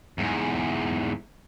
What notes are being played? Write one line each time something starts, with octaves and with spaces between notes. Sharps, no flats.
E2 G#2